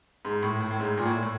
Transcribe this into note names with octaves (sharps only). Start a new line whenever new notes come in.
G#2
A2
A2
A2
G#2
A#2
A2
A2